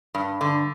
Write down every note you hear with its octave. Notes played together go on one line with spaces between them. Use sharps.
G2
D3